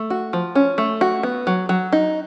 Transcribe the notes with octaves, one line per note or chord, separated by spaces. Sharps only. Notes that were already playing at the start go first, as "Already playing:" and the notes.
Already playing: A3
F#4
F3
C#4
A3
F#4
B3
F#3
F#3
D#4